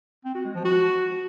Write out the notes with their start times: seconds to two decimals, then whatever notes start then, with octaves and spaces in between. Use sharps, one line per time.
0.25 C4
0.35 F#4
0.45 G#3
0.55 F3
0.65 F#4